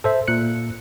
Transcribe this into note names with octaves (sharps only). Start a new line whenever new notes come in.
A4 C5 E5
A#2 F#6 C#7